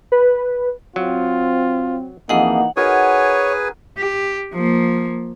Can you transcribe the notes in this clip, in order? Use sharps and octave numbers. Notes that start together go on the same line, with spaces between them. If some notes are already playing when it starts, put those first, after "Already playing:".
B4
F#3 C4 F4
F2 E3 A#3 D#4 G#4 D#5 F#5
D#4 F#4 G#4 A#4 B4 C#5 G#5
G4
F3 A#3